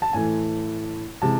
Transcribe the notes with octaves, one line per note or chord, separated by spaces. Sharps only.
A5
A2 E3 A3 G#5
C3 E3 G#3 A5